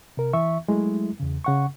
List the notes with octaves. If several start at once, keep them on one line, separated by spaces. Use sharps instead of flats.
C3 A#4
E3 E5 C#6
F#3 G#3 A3 E4
E2 C#3
C#3 F#5 C#6